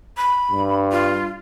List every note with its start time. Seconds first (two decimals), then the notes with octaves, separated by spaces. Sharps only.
0.17 B5
0.52 G2
0.92 F4